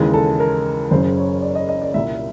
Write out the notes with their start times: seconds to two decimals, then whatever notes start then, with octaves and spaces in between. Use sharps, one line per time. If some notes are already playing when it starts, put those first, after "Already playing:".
Already playing: D#2 C#3 E3 G#3
0.14 A4
0.40 A#4
0.91 F#1 F#2 C#3 C5
1.17 C#5
1.42 D5
1.55 D#5
1.69 D#5
1.82 D5
1.94 C2 A#2 G3 E5